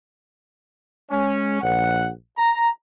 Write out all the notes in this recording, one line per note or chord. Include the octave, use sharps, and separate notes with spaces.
G#3 C#4
A#1 F#5
A#5